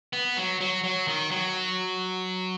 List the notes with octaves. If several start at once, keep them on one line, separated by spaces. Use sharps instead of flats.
B3
F#3
F#3
F#3
D#3
F#3